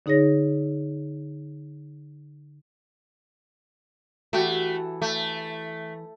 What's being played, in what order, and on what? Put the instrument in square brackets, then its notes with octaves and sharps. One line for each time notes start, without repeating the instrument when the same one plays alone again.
[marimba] D3 D#4 G#4 C#5 A#6
[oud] E3 F#4 G4 [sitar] A3
[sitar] A3